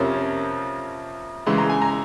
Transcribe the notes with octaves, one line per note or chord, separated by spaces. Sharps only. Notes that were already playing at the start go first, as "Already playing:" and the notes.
Already playing: F2 C3 F3 A#3 C#4 C6
C#3 E3 G#3 C6
A#5
G#5
A#5